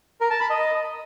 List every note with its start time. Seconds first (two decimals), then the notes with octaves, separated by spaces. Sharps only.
0.21 A#4
0.30 A5
0.40 B5
0.50 D#5